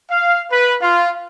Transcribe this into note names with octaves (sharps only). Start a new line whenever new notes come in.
F5
B4
F4